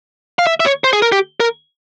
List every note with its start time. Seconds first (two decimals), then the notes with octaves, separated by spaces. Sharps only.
0.39 F5
0.47 E5
0.60 E5
0.66 C#5
0.84 C5
0.93 G#4
1.02 A#4
1.12 G4
1.40 A#4